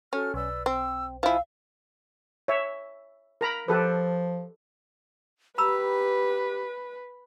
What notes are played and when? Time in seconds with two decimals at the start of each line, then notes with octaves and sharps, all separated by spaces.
0.13 C#4 F#4 A4 F6
0.34 B1 B4 D5 E6
0.66 C4 E6
1.23 F3 E4 F5 G#5 E6
2.48 C#5 E5
3.41 A#4 A#5 B5
3.68 F3 G4 A4 B4
5.58 G4 B4 A#5 B5 E6